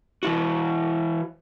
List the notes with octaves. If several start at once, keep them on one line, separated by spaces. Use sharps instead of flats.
E3 E4 F#4